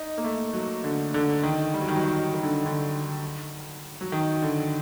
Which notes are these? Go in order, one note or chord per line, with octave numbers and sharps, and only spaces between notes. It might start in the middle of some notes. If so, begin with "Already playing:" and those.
Already playing: D#4
A#3
A3
F#3
D3
D3
D#3
G3
F#3
D#3
F#3
D#3
D#3
D3
D3
F#3
D#3
D3